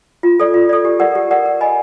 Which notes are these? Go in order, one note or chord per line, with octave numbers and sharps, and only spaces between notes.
F4
A4 D5
F4
A4 D5
G4
A#4 D5 F#5
G4
A#4 D5 F#5
A#4
D#5 G#5 B5